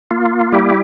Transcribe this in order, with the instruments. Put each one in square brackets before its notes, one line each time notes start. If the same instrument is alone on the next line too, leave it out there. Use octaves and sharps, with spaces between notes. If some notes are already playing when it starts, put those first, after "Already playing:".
[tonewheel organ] A#3 F4
G3 E4 G4